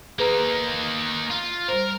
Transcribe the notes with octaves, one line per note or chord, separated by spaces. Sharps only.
A#3 D#4 G#4 B4 A#5
F4
G3 A#4 C5